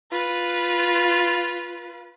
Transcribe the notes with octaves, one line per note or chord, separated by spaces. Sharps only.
F4 B4